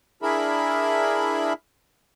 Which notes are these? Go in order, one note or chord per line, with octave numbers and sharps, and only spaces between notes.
D4 E4 G#4 A#4 E5 B5